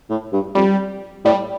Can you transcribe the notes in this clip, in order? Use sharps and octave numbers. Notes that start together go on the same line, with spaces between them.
A2
G2
F2 G3
A2 G3